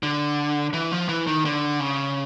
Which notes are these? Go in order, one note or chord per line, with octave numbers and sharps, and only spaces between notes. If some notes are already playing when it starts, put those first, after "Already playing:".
D3
E3
F3
E3
D#3
D3
C#3